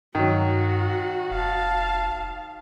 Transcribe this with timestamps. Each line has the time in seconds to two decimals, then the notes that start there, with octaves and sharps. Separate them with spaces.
0.15 G2 D#3 F#3 F#4
1.31 F1 F5 A5